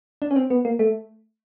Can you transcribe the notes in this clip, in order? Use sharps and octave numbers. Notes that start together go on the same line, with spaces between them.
D4
C#4
C4
B3
A#3
A3